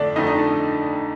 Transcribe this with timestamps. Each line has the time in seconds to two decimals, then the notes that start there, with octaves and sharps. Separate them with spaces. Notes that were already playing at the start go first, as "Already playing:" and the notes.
Already playing: F2 D3 A3 D4 D5
0.16 F2 D3 A3 D#4 D#5
0.27 D#4 D#5
0.38 A4